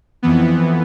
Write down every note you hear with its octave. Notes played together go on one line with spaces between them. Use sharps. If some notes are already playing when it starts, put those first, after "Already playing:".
F2 E3 B3